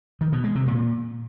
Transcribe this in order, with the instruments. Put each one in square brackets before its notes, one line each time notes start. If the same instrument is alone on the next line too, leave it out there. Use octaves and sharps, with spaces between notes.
[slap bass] D#3
B2
G#3
C3
A#2